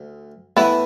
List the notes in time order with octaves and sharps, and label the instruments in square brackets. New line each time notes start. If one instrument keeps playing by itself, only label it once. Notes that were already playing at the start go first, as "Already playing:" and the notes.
Already playing: [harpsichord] D2
[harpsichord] A2 E3 A3 [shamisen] B3 E4